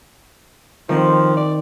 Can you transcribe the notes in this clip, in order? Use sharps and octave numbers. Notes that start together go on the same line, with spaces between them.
D#3 F3 C4
D5